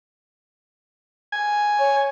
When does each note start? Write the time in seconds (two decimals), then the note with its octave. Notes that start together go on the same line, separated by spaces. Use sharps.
1.32 G#5
1.78 C#5